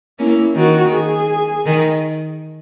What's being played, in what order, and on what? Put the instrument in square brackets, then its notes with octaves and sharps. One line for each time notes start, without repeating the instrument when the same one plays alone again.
[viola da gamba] A#3 C#4 [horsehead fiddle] E4
[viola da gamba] D#3 [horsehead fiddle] F#4
[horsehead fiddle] G#4
[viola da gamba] D#3